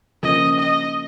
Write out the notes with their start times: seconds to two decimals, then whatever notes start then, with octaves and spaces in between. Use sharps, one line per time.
0.23 C#3 F3 A#3 C#4 D#5
0.59 D#5